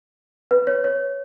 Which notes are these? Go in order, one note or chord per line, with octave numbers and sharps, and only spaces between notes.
B4
C#5
C#5